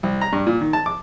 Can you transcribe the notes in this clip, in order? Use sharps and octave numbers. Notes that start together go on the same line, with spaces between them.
C2
A#5
G2
A#2
D#3
A5
D6